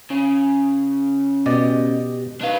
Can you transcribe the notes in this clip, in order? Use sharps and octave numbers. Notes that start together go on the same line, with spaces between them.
C#3 G#5
B2 G4 D5 D#5
D4 D#4 B4 F5